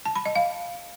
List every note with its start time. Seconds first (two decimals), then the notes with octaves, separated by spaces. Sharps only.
0.06 A5
0.16 B5
0.26 D#5
0.36 F5